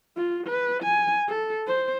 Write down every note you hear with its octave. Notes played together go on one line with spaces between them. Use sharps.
F4
B4
G#5
A4
C5